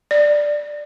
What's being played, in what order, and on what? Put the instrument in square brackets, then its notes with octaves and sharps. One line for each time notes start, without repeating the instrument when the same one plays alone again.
[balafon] D5